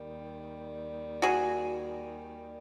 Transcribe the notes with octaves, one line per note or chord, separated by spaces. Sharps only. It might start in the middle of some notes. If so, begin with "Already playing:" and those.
Already playing: D#2 D#3 G3
F#4 G#4